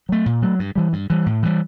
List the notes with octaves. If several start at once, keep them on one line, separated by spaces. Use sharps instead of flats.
F#3 A3
A#2
F#3 A3
G2
E3 G3
G2
E3 G3
A2
E3 G3